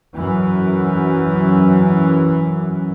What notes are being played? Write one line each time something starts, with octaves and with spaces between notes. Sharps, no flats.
F#2 E3